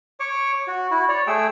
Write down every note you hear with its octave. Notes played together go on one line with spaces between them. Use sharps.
C#5 C#6 D6
F#4
E4 F#4
C#5 D5
A3 G#4 G5 E6